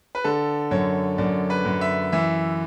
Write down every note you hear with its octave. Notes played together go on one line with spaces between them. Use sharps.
B4
D3 A4
F#2 C#5
F#2 D5
B4
F#2
E5
E3 E5